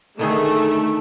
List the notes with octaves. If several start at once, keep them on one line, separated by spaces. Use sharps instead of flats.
D3 D#3 A3 G#4